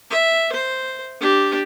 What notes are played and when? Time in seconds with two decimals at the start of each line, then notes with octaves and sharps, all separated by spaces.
0.10 E5
0.53 C5
1.20 D4 G4